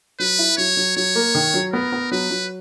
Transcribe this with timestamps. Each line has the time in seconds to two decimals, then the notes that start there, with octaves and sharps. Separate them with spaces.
0.19 F#3 B4
0.39 E4
0.57 F#3 C#5
0.77 F#3
0.96 F#3 C#5
1.15 A#3
1.35 D#3
1.54 F#3
1.73 B3 A#4
1.92 B3
2.11 F#3 B4
2.31 F#3